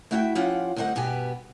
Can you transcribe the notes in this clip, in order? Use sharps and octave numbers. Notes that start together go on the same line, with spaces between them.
A3 E4 F#4 E5 F#5 G5
F3 C#4 F4 G4 F#5
D2 G3 C4 D#5 F#5
G2 B2 B3 G4 G#5